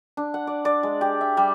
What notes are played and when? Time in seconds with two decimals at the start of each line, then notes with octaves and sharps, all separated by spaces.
0.17 D4
0.34 F#5
0.47 D5
0.65 D5
0.83 G#3
1.01 G4
1.21 E5
1.37 G3